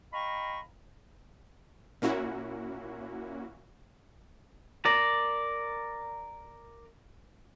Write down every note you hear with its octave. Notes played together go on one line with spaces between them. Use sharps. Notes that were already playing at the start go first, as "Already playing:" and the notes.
D#5 F5 G5 A#5 B5 C#6
A#2 A#3 C#4 E4 F#4
A#4 D5